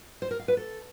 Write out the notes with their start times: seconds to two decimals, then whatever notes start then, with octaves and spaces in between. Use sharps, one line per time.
0.22 C5
0.31 A#4
0.39 F5
0.48 B4
0.57 A4